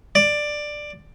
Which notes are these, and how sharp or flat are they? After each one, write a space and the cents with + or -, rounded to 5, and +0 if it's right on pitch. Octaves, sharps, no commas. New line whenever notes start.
D5 +10